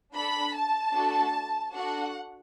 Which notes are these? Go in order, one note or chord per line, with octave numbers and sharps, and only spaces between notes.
D4 A4 B5
A5
A3 D4 F#4 A4
D4 F#4 A4 F#5